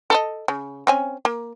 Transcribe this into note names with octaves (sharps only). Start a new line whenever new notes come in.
A4 A#4 D#5
C#3
C4 C#4 G#5
A#3